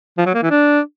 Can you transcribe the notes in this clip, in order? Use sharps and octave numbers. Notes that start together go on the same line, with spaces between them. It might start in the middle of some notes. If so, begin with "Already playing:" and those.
F3
F#3
A#3
E3
D4